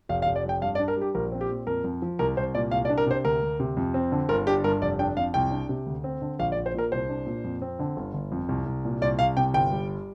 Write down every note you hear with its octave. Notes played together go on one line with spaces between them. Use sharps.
F1 F5
F5
F1
D5
F2 G5
G2 F5
D5
D4
A#4
G3
G4
A#1 A#4
C4
G4
A#2
F2 A#4
F2
F3
C2 A#4
C2 C5
A#2 D5
C2 F5
D5
D4
A#4
C3 C5
D2 A#4
D2
C3
F2
C4
D3
G1 A#4
D4 G4
G2 A#4
F1 D5
D4 G5
F2 F5
C2 G5
D4
C3
D2
C4
D3
A#1 F5
D5
A#1
C5
A#2 A#4
C2 C5
D4
A#2
F2
C4
D3
G1
G1
F2
C2
C2
A#2
C2 D5
C2 F5
C3 G5
G1 G5
G3